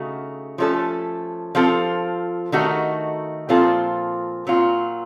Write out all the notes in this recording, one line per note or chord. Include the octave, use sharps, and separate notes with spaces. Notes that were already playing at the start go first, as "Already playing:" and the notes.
Already playing: C#3 A3 D#4 F#4
F3 A3 C#4 A4
F3 C4 F4 A4
D#3 A3 D#4 F#4 A4
A#2 F3 C4 F4 A4
A#2 F#3 C4 F4